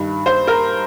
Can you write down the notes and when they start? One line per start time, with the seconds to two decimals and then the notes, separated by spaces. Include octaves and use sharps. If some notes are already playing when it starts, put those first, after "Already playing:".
Already playing: G2 D#3
0.26 C5
0.47 A#4